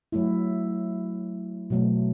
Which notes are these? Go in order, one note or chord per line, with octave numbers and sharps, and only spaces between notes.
F#3 A3 E4
B2 F#3 A3